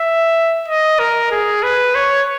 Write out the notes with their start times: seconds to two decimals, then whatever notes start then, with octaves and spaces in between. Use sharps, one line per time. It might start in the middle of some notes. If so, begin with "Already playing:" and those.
Already playing: E5
0.68 D#5
0.99 A#4
1.31 G#4
1.63 B4
1.95 C#5